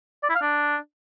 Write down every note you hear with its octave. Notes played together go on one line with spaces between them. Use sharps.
D5
E4
F5
D4